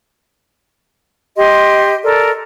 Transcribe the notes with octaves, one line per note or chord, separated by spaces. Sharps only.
G4 D#5 C6
A4 A#4 D5